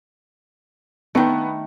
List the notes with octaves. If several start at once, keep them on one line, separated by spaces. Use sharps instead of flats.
D#3 A3 B3